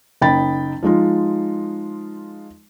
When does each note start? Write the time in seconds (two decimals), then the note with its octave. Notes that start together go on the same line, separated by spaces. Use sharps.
0.21 F#1 D#4 G5 B5 A6
0.83 F3 G#3 D#4 F4